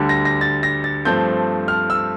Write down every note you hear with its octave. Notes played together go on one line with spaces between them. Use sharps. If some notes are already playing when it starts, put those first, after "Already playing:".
Already playing: D2 D3 G3 D4
A#6
A#6
A6
A#6
A6
G2 F3 A3 C4 G6
F6
E6